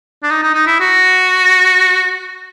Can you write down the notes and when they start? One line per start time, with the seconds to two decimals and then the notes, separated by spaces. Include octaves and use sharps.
0.23 D4
0.30 D#4
0.43 D#4
0.54 D#4
0.67 E4
0.80 F#4